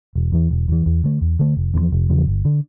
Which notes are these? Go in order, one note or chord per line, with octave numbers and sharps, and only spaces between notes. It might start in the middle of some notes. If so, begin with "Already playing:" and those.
E1
E2 E3
E1
E2 E3
E2
D3 A3
E2
D3 A3
F1
E2 C#3
F3
F1
E2 C#3 F3
G1
D3